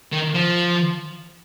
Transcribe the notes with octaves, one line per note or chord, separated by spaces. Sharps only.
D#3
F3